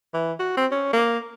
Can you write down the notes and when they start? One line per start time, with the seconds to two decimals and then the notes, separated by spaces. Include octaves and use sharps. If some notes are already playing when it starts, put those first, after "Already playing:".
0.14 E3
0.39 F#4
0.57 C4
0.71 C#4
0.93 A#3